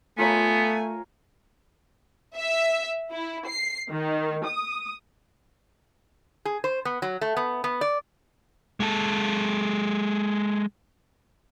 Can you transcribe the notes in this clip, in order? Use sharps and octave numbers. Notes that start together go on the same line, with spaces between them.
A3 B3 F4 A#4 C#5 G#5
E5
E4
C7
D#3
D#6
G#4
C5
B3
F#3
A3
B3
B3
D5
G#3 A4